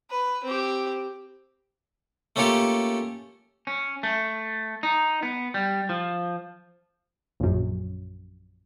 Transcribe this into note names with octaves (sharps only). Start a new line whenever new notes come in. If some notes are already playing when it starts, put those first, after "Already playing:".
B4
C4 G4
A3 A#3 C#4 F4 G4 A4
C#4
A3
D#4
B3
G3
F3
A#1 F#2